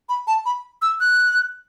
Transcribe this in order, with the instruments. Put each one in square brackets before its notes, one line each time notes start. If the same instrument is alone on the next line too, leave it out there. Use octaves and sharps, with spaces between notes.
[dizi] B5
A5
B5
E6
F#6